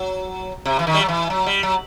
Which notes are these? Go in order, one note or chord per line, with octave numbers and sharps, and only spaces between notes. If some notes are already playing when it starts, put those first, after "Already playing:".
Already playing: F#3
C3
E3
D#3
G3
F#3
E3
F#3
G3
F#3